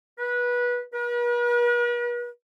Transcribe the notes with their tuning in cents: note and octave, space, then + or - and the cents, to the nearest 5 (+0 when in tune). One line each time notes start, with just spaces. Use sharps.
B4 -20
B4 -45